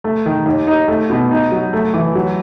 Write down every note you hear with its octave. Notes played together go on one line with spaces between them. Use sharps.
A3
D#3
D#2
D#4
A3
B2
D#4
F#3
A3
E3
F#3